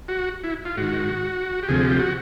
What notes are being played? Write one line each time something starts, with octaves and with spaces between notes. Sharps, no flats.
F#4
E4
F4
G#2 D#3 F#4
G4
D2 C3 F3 G#4
G4
F#4